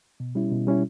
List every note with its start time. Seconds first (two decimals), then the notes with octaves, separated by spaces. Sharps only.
0.20 B2
0.35 G3 C#4 E4
0.52 B2
0.67 G3 C#4 E4